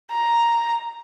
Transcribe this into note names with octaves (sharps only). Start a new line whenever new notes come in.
A#5